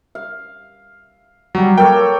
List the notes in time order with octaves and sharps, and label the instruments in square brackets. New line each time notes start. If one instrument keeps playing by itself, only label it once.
[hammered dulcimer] F5
[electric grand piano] F#3 G3
[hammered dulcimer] A#3 A4 C#5 [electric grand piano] G5